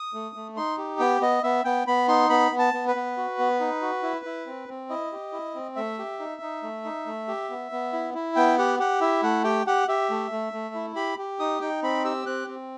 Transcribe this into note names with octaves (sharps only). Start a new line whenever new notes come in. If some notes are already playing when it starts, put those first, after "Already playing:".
Already playing: D#6
A3
A3
D#4 C6
G4
B3 G5
B3 D#5
B3 E5
B3 G5
B3 B5
D#4 C6
B3 B5
B3
A5
B3
B4
B3
F#4
B3
D#4
F#4
E4
E4
C4
C4
E4 D#5
G4
E4
C4
A3 E5
G4
D#4
D#4
A3
D#4
A3
G4
B3
B3
E4
E4
B3 G5
G4 F#5
G4 F#5
E4 E5
A3 F#5
G4 G5
G4 F#5
G4 E5
A3
A3
A3
E4
G4 B5
G4
D#4 D#6
D#4 G5
C4 B5
G4 E6
C4 F#6
C4